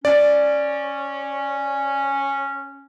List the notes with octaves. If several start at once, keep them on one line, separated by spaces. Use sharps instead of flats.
C#4 D5